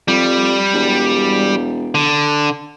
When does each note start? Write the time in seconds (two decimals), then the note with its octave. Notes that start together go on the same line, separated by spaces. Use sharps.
0.08 F2 G3
0.74 E1
1.95 D3